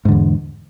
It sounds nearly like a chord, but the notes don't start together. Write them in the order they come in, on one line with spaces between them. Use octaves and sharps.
G#2 D3 E2